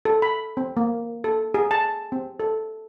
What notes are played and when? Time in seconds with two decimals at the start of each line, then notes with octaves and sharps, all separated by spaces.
0.05 A4
0.22 B5
0.57 C4
0.77 A#3
1.24 A4
1.54 G#4
1.71 A5
2.12 C4
2.40 A4